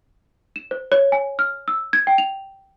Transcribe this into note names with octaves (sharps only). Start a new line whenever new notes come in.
E7
C5
C#5
G#5
F6
E6
G#6
G5
F7